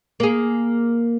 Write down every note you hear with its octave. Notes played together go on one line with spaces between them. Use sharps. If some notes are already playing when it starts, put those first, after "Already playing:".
A#3 G#4